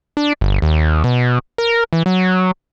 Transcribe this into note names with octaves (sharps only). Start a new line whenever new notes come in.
D4
G1
D#2
B2
A#4
E3
F#3